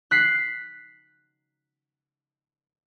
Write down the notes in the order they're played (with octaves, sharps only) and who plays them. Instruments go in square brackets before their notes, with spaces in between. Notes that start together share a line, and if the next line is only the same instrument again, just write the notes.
[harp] F#6 B6 C7